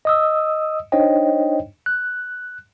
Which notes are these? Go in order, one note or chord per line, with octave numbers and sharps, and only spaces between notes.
D#5 D#6 E6
D4 D#4 C5 C#5 D#5 G5
F#6